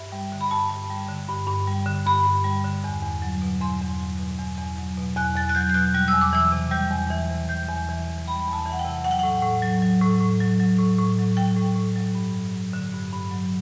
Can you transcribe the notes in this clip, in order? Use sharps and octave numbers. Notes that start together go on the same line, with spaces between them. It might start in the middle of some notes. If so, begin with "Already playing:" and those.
Already playing: G2 E5
G3
D3
B5
G2 A5
G2
G3
D3
G2
G2
G3
D3
G2 B5
G2
G3
D3
E2
E2
F#3
B2
E2 C6
E2
F#3
B2
E2
E2
F#3
B2
E2 F#6
E2 A6
F#6
F#3 G6
G6
B2 F#6
G3 F#6
E6
E2
D6
E3 E6
C3
G3 G6
E2
E3
C3
G3 G6
E2
E3
C3
G3 B5
E2
A5
E3
F#5
G5
C3
F#3 F#5
G5
A2 F#5
A2
F#3
F#3
A2
A2
F#3
F#3
A2
A2
F#3
F#3 G5
A2
A2
F#3
G2
G2
F#3
D3
G2
G2
F#3